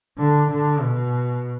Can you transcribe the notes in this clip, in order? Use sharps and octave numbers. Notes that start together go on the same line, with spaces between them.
D3
D3
B2